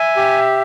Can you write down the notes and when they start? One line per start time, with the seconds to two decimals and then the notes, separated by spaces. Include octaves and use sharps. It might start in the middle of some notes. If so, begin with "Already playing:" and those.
Already playing: E5 G#5
0.17 G4